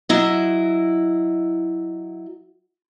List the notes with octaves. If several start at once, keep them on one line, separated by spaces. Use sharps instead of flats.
F#3 E4 D#5